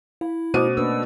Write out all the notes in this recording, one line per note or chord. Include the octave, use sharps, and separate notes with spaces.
E4 F5
B2 A3 C#4 C5 D6 D#6 D#7
A#3 D4 B4 E6